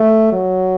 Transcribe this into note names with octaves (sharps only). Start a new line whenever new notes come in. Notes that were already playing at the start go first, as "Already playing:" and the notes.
Already playing: A3
F#3